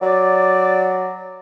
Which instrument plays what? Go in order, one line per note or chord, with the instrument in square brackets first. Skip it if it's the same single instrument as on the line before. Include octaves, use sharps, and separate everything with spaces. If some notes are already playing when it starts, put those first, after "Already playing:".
[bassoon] F#3 [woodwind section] D5